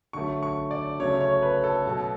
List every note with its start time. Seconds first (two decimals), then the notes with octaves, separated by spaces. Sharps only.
0.13 D3 F#3 A3 C#6
0.43 C#6
0.71 D5
1.00 C#3 F#3 A3 C#5
1.21 C#5
1.43 B4
1.64 A4
1.85 B2 F#3 A3